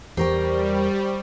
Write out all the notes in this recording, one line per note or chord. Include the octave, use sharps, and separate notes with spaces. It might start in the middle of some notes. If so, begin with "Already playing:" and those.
E2 G3 G4 A#4 C5 G5 C#6